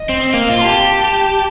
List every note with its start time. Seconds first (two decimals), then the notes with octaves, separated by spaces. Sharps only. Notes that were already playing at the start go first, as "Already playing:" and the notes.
Already playing: D#5
0.09 C4
0.33 A#3 F5
0.49 F4
0.57 C6
0.62 G4 A5
0.82 A5